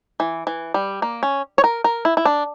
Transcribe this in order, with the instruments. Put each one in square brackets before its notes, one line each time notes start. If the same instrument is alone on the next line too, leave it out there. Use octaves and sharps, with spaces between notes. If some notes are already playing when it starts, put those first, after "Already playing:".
[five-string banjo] E3
E3
G3
A#3
C#4
C#5
A#4
A#4
E4
E4
D4